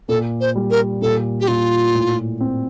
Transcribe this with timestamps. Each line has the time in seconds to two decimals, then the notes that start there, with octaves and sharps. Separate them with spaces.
0.09 A#2 A4
0.41 C5
0.56 G3
0.71 A#4
1.02 A#2 A4
1.40 G4
1.48 A#2 F4
1.94 A2
2.41 C4